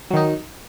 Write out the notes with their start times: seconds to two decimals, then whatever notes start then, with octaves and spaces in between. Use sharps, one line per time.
0.11 F#3
0.13 D#3
0.16 D#4